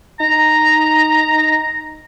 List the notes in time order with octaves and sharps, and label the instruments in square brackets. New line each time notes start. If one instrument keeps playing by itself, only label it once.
[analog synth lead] D#4 [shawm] A#5